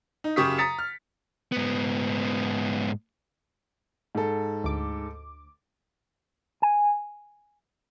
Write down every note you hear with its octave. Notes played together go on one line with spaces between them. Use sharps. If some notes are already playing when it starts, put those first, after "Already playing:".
D#4
F#2 C#3 G4 C#6 D#6 B6
A#5 D#6 A6 B6 C#7
F6
G#2 B3
G#2 A4
D2 D6
G#5